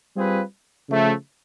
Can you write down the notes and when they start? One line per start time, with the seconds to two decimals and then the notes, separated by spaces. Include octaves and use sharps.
0.16 G3 C4 F4 G#4 B4
0.88 C#3 F3 A3